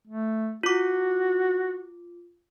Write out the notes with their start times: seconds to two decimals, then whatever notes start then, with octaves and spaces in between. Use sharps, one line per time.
0.07 A3
0.63 F4 F#4 D6